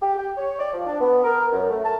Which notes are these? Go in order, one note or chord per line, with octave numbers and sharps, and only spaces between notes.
G4
G5
C#5
D5
F3
D4
B3
A#4
F#2
A3
A5